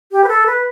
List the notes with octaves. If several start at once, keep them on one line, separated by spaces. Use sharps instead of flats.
G4
B4
A4
B4